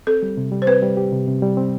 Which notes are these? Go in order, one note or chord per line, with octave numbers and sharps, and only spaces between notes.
C4 A4
G3
C3
G3
C5
C4 B4
G3
G4
C3
C3
G3
C4